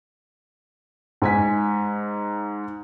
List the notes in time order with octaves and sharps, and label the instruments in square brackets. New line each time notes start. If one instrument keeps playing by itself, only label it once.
[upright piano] G#2 G#5 B6